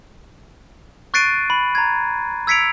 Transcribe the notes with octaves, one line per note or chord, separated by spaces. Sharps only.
C#6 F#6 A6 C7 D7 D#7
B5
A#5 G#6
E6 G#6 B6 C#7 D7 F7